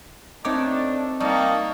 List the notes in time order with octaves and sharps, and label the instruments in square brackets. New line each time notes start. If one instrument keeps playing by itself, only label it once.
[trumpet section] A3 D4 [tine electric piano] C4 D6 [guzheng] D#4 C#5
[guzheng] G3 [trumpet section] A#3 A5 C#6 [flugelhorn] D#4